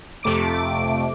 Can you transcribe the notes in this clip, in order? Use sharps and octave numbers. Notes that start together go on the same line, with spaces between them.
F2 C3 A3 D6 D7